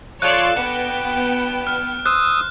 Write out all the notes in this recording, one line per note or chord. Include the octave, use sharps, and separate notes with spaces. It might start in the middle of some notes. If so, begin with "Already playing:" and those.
F3 F4 A4 C#5 D5 C6 F#6 E7
B3 D4 F#4 G5
F6
C5 D#6 E6 F#6